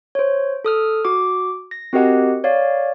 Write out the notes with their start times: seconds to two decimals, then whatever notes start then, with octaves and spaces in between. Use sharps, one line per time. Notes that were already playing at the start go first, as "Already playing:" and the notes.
0.15 C5 C#5
0.65 A4 D#6 F6
1.05 F#4 D6
1.71 A#6
1.93 C4 F#4 G4 A#4 D#5 F#5
2.44 C#5 D5 F5